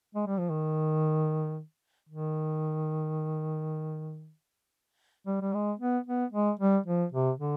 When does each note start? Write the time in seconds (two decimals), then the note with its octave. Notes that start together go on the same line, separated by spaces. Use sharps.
0.15 G#3
0.27 G3
0.38 F3
0.50 D#3
2.09 D#3
5.27 G3
5.41 G3
5.54 G#3
5.80 B3
6.07 B3
6.33 G#3
6.60 G3
6.86 F3
7.12 C3
7.39 D3